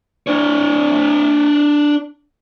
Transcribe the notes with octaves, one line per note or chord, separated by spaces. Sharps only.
D4 C#5